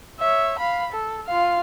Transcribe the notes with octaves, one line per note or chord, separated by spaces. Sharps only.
C#5 E5
F5 B5
A4
F4 F5